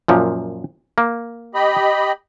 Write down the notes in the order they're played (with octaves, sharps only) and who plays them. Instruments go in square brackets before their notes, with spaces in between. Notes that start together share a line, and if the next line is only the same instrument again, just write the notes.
[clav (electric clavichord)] F#2 A#2 F3
A#3
[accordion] G4 D#5 B5